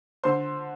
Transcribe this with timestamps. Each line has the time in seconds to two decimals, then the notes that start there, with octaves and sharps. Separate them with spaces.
0.23 D3 C5 C6